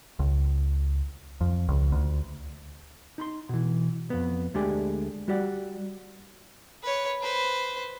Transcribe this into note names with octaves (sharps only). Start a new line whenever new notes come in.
C#2
F2
C#2
D2
D#4 B5 C6
B2 E3
F2 B3
D2 G#3 A3 D4 G4 G#5
G3 F#4 G4 D5 F#5
B4 C#5
B4 C5